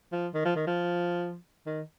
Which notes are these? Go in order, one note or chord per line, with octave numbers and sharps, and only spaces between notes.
F3
D#3
F3
D#3
F3
D#3